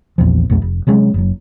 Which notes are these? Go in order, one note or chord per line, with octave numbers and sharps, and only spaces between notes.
A#1 E2 A#2 F3
B1 F2 A3
F1
C3 F#3 G#3 C#4
F#1 F#3